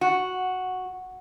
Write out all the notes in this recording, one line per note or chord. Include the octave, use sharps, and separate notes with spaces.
F#4